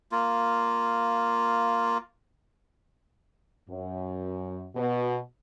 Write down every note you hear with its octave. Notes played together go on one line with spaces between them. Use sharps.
A#3 F4
F#2
B2